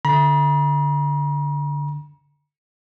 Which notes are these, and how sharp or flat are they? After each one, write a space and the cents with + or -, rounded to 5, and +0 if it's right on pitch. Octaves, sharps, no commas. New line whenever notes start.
D3 -10 A#5 +45